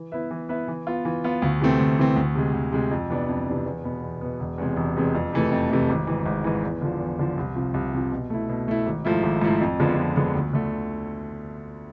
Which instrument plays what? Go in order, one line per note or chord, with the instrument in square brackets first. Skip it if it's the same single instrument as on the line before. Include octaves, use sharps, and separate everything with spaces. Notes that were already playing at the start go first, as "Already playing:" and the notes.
Already playing: [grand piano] E3
B3 E4 B4 E5
E3
B3 E4 B4 E5
E3
B3 F4
E3
B3 F4
D2
C3 E3 A3 C4
D2
C3 E3 A3 C4
D2
C3 G#3
D2
C3 G#3
F2
C3 E3 B3 D4
F2
C3 E3 B3 D4
E2
B2 B3
E2
B2 B3
E1
E2 C3 G#3
E1
E2 C3 G#3
F2
C3 E3 A3
F2
C3 E3 A3
G#1
G#2 E3
G#1
G#2 E3
E2
D3 F3
E2
D3 F3
C2
C3 F3
C2
C3 F3
B2
A3 E4
B2
A3 E4
G#1
G#2 F3 A3 E4
G#1
G#2 F3 A3 E4
F2
D3 F3 G#3 B3
F2
D3 F3 G#3 B3
D2
D3 A3